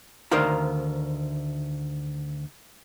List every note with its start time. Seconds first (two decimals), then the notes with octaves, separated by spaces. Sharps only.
0.31 D2 D#3 A#4 C5 F5 A#5